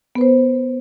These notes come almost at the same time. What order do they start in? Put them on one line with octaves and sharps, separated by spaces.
B3 B4 C5